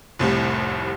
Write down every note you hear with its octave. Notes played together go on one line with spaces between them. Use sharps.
F1 C2 A2 G3